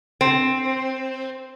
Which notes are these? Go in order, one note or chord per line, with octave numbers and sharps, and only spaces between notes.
C4